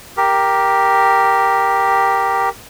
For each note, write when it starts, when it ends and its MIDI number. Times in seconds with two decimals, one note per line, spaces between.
0.17 2.49 67
0.17 2.49 70